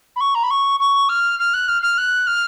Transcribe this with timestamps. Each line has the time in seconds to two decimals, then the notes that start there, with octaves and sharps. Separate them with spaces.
0.16 B5
0.21 C#6
0.35 A#5
0.43 B5
0.50 C#6
0.80 C#6
1.09 F6
1.39 F6
1.54 F#6
1.68 F6
1.82 F6
1.98 F#6
2.27 F6